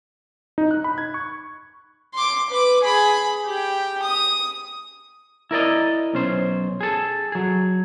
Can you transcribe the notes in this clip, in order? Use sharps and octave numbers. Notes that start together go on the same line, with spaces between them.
D#4
F#6
B5
G#6
C#6
C6 D6
B4 D6
G#4 B5
G4 G5
D#6
E4 A#4 D5 D#5
B1 C#4 C5
G#4 A4
F#3 G#4